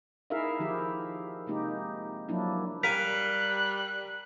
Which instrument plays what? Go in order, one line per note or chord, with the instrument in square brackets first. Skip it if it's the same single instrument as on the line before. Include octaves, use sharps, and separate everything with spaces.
[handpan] D#4 E4 G#4 A#4 E5 F5
D#3 F3 E4 G4
C3 G#3 A#3 D#4 G4
F3 F#3 A#3 D4 E4
[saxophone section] G3 [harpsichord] A#4 F5 G#5 [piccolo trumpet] F#6 [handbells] B6